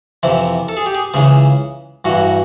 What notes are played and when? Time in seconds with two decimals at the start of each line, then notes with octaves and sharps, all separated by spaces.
0.23 F2 C3 E3 E4
0.69 A4
0.77 G#4
0.86 G4
0.95 G#4
1.14 C#2 C#3 E3 G#4
2.05 G2 E3 F#4